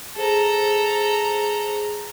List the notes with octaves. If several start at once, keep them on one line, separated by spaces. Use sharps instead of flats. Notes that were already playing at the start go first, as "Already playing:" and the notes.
G#4 A4 C5 A#5